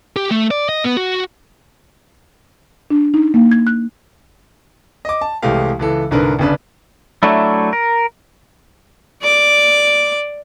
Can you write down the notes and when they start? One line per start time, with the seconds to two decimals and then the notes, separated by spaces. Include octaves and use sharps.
0.16 G4
0.31 A3
0.51 D5
0.69 D#5
0.84 B3
0.97 F#4
2.91 D4
3.14 D#4
3.34 A#3
3.51 G#6
3.67 F#6
5.05 D#5 D6
5.21 A5
5.42 C2 E3 G#3 A3 G4 F5
5.79 C#2 E3 A4
6.11 C2 G#2 D3 A#4 B4
6.39 G1 G2 C#3 D4 B4
7.23 F#3 A3 D4 E4
7.73 A#4
9.22 D5 D6